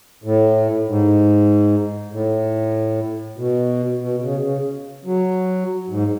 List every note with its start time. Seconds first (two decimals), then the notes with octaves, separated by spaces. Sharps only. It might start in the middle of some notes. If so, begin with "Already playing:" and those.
0.24 A2
0.87 G#2
2.12 A2
3.38 B2
4.01 B2
4.22 C#3
4.43 C#3
5.05 F#3
5.89 G#2